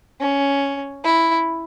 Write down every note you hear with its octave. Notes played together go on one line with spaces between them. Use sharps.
C#4
E4